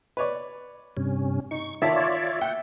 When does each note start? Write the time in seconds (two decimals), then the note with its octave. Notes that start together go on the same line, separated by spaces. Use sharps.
0.17 B4 C#5 D5
0.97 G2 C3 C#4
1.51 D#4 C#6
1.82 D#3 F4 C#5 D5 E5 A5
2.41 F#5 G5 G6